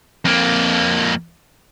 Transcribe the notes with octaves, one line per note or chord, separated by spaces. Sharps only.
F2 A#3